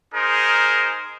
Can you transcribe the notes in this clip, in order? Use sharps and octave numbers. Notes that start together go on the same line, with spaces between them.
D#4 G#4 A#4 C5